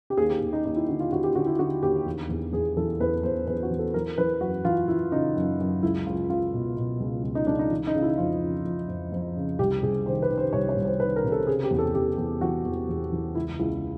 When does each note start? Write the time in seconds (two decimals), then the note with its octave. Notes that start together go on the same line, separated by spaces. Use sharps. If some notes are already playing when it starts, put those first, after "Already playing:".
0.10 G4
0.17 D#2 G#4
0.29 G4
0.42 D#2
0.53 D#4
0.65 D#2 D#4
0.76 E4
0.88 D3 F#4
1.00 F4
1.12 D#2 F#4
1.24 G4
1.35 D3 F#4
1.47 E4
1.58 D3 F#4
1.83 D#2 G4
2.06 E2
2.29 E2
2.53 E2 G#4
2.77 E3 A4
3.00 E2 B4
3.23 E2 C5
3.47 E2 B4
3.63 F#4
3.71 E3
3.79 A4
3.94 E3 A#4
4.18 E3 B4
4.41 F#2 F#4
4.65 E3 F4
4.88 E3 E4
5.12 C#3 D#4
5.36 F#2
5.60 F#2
5.83 C#2 E4
6.06 C#2 F4
6.30 C#2 F4
6.53 B2
6.77 B2
7.00 C#2
7.23 C#2
7.35 D#4
7.47 C#2 D4
7.59 D#4
7.71 E3
7.87 D#4
7.95 C#3
8.02 E4
8.18 F2 F4
8.41 C#3
8.65 F2
8.89 F2
9.12 F2
9.36 C#3
9.59 C2 G4
9.82 C2 G#4
10.06 D#3 C5
10.22 B4
10.29 D#3
10.38 C5
10.53 C2 C#5
10.69 C#5
10.76 C2
10.85 C5
11.00 D#3 B4
11.16 A#4
11.24 C3
11.32 A4
11.47 C#3 G#4
11.64 G4
11.71 E2
11.79 A4
11.94 E2 G4
12.18 E2
12.41 E3 F#4
12.65 E2
12.89 E2
13.12 E3
13.35 C#2 E4
13.59 C#2 E4